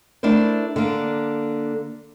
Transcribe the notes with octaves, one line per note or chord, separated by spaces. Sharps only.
A3 D4 E4 A#4 C5
D3 A#3